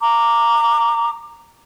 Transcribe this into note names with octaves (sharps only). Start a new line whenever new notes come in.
A#5 D6